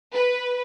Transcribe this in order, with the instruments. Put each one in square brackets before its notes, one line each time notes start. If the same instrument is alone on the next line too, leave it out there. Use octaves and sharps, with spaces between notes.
[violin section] B4